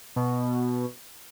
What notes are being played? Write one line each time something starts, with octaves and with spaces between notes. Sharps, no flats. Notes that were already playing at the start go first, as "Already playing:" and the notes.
B2